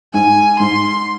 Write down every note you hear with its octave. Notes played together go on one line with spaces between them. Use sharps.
G#2 G#5
G#2 C6